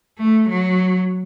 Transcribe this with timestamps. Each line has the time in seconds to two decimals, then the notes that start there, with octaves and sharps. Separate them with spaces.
0.19 A3
0.50 F#3